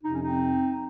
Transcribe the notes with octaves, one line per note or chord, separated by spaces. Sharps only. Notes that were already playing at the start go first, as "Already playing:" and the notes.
F2 C3 F3 D#4
C#4
C4 D#4